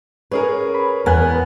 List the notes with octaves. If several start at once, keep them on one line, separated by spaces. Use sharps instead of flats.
C#4 G#4 A#4 B4
B5
E2 B3 A#4 G#5 F#6